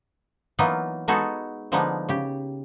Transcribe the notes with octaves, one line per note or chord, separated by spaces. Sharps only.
E3 F#3 A#3 B3 D#4 F4
G#3 B3 D#4 F#4 G#4 A4
D3 F3 G#3 A#3 B3 D#4
C#3 G4